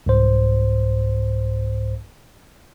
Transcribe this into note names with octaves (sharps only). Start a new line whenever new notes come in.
C2 G#2 C5